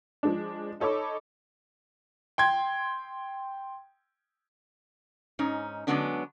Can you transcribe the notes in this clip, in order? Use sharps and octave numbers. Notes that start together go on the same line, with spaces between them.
F3 G#3 D4
D#4 A4 C#5 B5 D6
G5 C6 G#6
G#2 C#4 D#4
D3 F#3 G#3 B3 C#4 D4